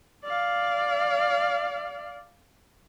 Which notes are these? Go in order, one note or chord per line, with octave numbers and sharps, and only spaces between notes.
D5 F5